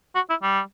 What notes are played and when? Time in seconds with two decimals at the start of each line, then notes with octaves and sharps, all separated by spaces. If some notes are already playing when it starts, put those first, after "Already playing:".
0.15 F#4
0.30 E4
0.43 G3